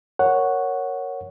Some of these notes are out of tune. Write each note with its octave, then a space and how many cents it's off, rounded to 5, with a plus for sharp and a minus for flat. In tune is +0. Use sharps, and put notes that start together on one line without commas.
A#4 +0 C#5 +0 F#5 +0